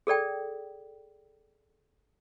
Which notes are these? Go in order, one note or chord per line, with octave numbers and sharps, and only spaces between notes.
G#4 A4 D5 G5